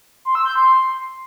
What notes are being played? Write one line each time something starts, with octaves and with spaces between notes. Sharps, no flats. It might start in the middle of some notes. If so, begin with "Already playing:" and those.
C6
E6
G6
C6